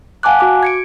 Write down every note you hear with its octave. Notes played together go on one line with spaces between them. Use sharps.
F5 F#5 G#5 A5 D6 F#6
F#4 D6
G#6 C#7 D7